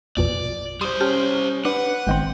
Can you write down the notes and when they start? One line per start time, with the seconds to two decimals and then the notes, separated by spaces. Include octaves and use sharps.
0.17 A#1 F2 B2 D5
0.81 G3 C5 C6 D#6
1.01 C#4 G4 A5 F6
1.65 D4 B4 F#5
2.07 G#1 D#3 C4 G5